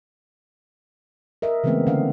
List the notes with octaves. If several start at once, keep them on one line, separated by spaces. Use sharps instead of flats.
A#4 D#5 E5
C#3 E3 G#3 A3 B3 C4
D3 C#4 F5